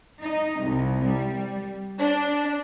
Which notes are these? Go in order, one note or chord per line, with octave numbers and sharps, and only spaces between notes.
D#4
C2
G3
D4